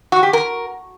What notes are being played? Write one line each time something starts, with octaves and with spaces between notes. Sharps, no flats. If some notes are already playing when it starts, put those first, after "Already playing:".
F#4
G4
A#4